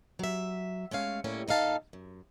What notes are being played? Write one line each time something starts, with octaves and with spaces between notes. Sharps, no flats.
F#3 E5
G#3 A3 C#4 F5
A2 G3 A#3 C#4
A#2 D#4 A4 F5 A5
F#2